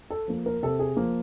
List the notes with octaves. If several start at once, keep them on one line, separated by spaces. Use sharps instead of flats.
A4
F3 A#3
A#4
C3 A4
G#4
F3 A#3